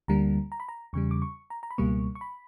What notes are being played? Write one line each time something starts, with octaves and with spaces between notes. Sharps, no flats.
D2 D3 G3 A#3 A#5
A#5
B5
A#5
E2 C#3 G3 C#6
D6
C#6
A#5
A#5
B5
C#2 B2 G3 A#3 C#6
C#6
B5